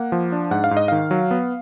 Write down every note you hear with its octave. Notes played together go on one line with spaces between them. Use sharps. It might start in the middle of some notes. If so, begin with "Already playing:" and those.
Already playing: A#3 F#5
F3
D4
G#2 F#5
F5
G#2
D#5
D#3 F5
F#3
B3